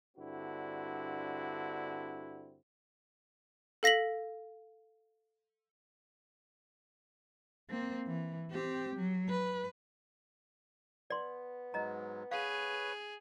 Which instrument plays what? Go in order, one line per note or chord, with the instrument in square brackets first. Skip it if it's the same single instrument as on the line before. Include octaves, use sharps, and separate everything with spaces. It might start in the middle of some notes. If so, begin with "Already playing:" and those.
[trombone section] G2 D3 C4 E4 F#4
[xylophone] A4 F5 A#6 B6 F#7
[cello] A#3 C4
E3
C4 G4
F#3
B4
[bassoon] B3 [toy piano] D5 C6
[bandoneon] G#2 F#3 G#3 [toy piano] D#5 A#5
[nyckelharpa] G#4 [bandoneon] B4 C#5 [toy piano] F5